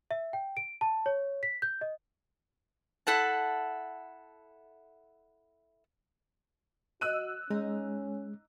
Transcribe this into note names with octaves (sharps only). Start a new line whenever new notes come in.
E5
G5
D7
A5
C#5
B6
G6
D#5
E4 A4 F#5 A5
F#4 D#5 E6 F#6 D#7
G#3 C#4 D#4